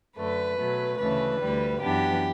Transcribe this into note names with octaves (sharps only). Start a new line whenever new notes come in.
F#2 D3 A3 B4
B2 F#3 A3
D2 C#3 E3 A3 B4
D2 D3 G3
F#2 E3 B3 D4 G4